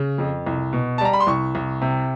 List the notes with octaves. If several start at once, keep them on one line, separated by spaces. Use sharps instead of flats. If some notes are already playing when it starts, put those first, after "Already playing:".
Already playing: C#3
F2
C2
B2
A5
G3 A#5
B5
C6
C2 C#6
C2
C3